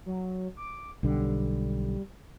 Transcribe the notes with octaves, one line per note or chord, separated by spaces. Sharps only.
F#3
D6
B1 D3 G3